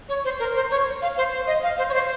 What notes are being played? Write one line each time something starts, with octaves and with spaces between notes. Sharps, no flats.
C#5
C5
A#4
C5
C#5
F5
C5
D#5
F5
C5
C#5
C5